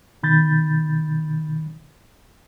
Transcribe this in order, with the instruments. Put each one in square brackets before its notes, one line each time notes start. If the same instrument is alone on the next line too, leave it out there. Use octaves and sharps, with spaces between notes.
[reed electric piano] B2 D#3 B5 G6 A6